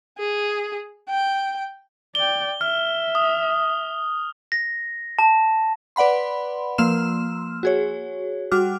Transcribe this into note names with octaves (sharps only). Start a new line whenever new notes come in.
G#4
G5
D5 G5 G7
E5 F6
D#6
A#6
A5
B4 D5 F#5 B5 C6
F3 A#3 C6 E6 F6 E7
F#4 G#4 C#5
G3 F#4 D6 F6